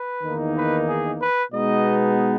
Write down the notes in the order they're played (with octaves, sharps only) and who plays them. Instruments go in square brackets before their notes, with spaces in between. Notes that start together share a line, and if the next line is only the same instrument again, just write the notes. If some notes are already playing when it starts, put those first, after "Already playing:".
Already playing: [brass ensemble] B4
E2 D#3 A#3 D#4
B4
G#4
B4
B2 G#3 B3 D#4 D#5